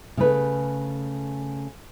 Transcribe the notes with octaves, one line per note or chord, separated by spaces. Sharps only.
C#3 A3 B4